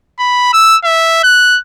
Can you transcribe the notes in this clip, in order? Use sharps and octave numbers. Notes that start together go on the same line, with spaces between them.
B5
E6
E5
F#6